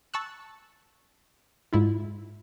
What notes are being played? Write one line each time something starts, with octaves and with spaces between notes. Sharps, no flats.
A5 C#6 E6 F#6
G#2 E4 F4